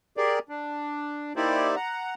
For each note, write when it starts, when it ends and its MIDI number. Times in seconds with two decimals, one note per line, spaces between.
0.17 0.39 67
0.17 0.39 68
0.17 0.39 70
0.17 0.39 74
0.49 1.33 62
1.36 1.75 58
1.36 1.75 63
1.36 1.75 64
1.36 1.75 67
1.36 1.75 72
1.36 1.75 74
1.76 2.14 78
1.76 2.14 82